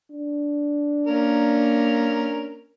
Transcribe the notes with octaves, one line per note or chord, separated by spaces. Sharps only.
D4
A#3 C#4 A#4